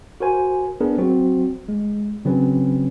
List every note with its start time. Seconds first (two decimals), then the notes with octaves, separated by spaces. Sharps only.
0.20 F#4 A#4 C5 G#5
0.80 B3 D4 G#4 A#4 B4
0.98 F#3 C4 F#4 C5
1.68 G#3
2.25 C#3 F#3 C4 C#4 B4